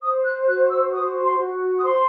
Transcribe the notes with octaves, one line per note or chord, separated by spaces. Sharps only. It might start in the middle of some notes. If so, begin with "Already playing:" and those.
C5 D#6
F#6
F#4 F#6
E6
C5 D#6
C6
F#4
D#6
C5 C6